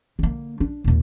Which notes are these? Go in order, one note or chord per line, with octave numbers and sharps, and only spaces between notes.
D3 A#3
D4
D#2 A#2